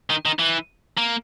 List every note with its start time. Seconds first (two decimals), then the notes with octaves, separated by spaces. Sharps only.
0.10 D#3
0.26 D#3
0.39 E3
0.98 A#3